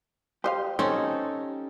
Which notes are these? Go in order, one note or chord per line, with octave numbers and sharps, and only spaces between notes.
G4 C5 D#5 F5
C4 C#4 D#4 A4